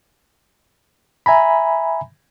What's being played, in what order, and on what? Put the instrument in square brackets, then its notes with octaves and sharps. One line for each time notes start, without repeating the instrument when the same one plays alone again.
[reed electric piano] E5 G#5 A#5 B5